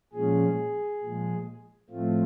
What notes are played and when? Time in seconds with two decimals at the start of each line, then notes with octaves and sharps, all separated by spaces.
0.13 A#2 F3 G#3 C#4 G#4
1.02 A#2 F3 G#3
1.90 A2 F3 A3 C4 F4